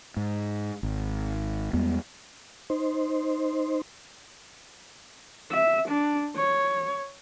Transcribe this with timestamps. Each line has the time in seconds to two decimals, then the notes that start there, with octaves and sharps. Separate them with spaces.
0.17 G#2
0.83 G#1
1.73 E2 G3 G#3 B3
2.70 D#4 C5
5.52 E5
5.88 D4
6.36 C#5